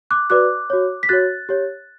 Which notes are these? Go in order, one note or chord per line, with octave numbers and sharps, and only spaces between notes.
D6 F#6
F#4 B4 D5 D6 F#6
F#4 C#5
B6
F#4 C#5 F#6 A6
G4 C#5